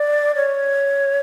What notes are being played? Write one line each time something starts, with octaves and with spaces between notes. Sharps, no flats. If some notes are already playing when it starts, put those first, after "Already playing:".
Already playing: D5
C#5